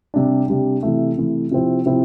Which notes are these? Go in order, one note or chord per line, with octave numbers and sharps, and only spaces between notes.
C3 G3 D4
C3 G3 D4
C3 E3 A3
C3 E3 A3
C3 F3 C4 E4
C3 F3 C4 E4